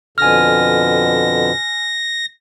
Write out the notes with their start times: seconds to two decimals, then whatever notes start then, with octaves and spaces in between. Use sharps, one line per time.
0.18 F2 B2 D3 G#5 F6 A#6